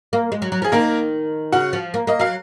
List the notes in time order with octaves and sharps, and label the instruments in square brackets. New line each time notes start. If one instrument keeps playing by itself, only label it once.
[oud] A#3
G#3
F#3
F#3
[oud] F3 [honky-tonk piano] G#4
[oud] D#3 [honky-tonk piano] A#3 A#4
[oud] C#3 [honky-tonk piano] F#4 F#5
[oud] F3
A#3
[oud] A#3 [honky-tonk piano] D#5
[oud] F#3 [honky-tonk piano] F5